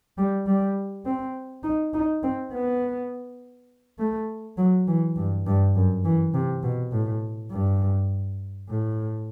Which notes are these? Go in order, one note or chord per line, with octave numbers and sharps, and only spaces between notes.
G3
G3
C4
D#4
D#4
C4
B3
A3
F#3
E3
G2
G2
F#2
E3
C3
B2
A2
G2
A2